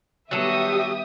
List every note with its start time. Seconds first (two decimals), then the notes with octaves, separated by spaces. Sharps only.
0.31 D#3 F#3 G3 B3 G4 A4 E5 D#6